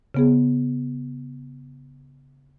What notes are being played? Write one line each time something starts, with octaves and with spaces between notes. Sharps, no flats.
C#3 B3 G#4